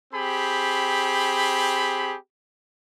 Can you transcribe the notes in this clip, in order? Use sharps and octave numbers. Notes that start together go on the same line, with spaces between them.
C4 G4 G#4 B5